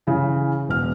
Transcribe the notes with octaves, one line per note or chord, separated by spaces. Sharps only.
C#3 E3
E1 F6